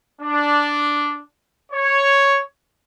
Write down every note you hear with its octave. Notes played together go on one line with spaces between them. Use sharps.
D4
C#5